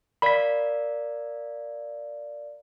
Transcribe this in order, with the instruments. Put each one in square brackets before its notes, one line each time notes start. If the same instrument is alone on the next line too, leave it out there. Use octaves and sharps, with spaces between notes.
[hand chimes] A#4 D5 F5 [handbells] B5 B6